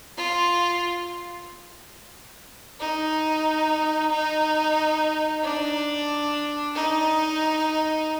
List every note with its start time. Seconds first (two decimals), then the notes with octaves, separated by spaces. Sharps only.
0.17 F4
2.80 D#4
4.11 D#4
5.43 D4
6.74 D#4